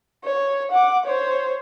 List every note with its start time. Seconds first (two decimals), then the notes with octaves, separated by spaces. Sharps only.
0.24 C#5
0.71 F#5 D6
1.06 C5 C#5